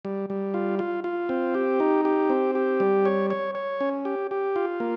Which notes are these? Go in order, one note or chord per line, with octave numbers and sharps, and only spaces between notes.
G3
G3
F4
F4
F4
C4
G4
D#4
G4
C4
G4
G3
C#5
C#5
C#5
C#4
G4
G4
F4
A#3